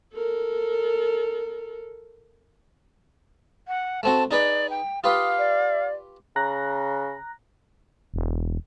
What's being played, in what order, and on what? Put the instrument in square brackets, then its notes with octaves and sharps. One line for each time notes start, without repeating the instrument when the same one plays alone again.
[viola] A4 A#4
[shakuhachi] F#5
[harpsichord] A3 C4 F#4 [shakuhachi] A5
[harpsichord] D#4 G#4 B4 [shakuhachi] D5
[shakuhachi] G5
[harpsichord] F4 G4 B4 [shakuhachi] F5 [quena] D#6
[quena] D5
[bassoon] C#3 [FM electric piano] A#5 F#6 A#6
[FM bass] E1